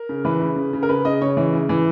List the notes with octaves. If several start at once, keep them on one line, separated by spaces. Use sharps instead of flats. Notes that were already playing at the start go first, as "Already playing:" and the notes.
Already playing: A#4
C#3
E3 B4
C#3
C#3
C#3
A#4
C#3 B4
C#3 D#5
C#3 C#5
E3
C#3
E3